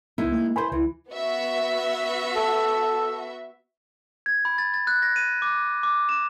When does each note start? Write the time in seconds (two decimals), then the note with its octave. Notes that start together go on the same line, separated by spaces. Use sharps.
0.18 C#2 G#3 B3 D#4 E4
0.32 A#3
0.56 B4 C5 G#5 B5 C6
0.72 C#2 E3
1.10 B3 F#4 E5
2.35 A4
4.26 G#6
4.45 B5
4.58 A6
4.74 A6
4.87 F#6
5.02 A#6
5.16 D#7
5.42 D6
5.83 D6
6.09 E7